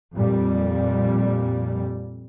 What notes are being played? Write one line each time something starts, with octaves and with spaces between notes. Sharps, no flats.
F2 A#2 G3